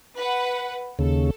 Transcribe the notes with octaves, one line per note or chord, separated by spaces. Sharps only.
B4 F#5
D#2 C#3 A4